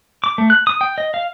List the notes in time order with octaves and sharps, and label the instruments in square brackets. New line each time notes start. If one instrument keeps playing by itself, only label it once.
[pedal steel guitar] D6
A3
F#6
D#6
G5
D#5
F5